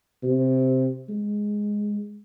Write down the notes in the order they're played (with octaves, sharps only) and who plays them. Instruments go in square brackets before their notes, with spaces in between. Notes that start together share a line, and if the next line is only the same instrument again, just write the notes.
[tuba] C3
G#3